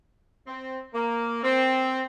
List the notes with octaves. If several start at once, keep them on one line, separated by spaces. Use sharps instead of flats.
C4
A#3
C4